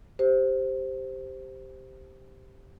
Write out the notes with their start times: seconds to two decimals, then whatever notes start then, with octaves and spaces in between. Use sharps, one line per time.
0.19 G4 C5